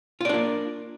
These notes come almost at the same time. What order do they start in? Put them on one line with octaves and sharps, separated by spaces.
F4 D5 D4 A#3